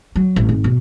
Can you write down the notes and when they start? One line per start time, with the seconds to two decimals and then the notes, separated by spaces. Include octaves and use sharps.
0.16 F#3
0.36 A1
0.49 G#1
0.64 B2